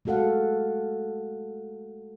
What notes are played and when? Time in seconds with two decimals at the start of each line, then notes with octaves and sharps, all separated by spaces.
0.05 G#3 A3 F#4 A4 F5 F#5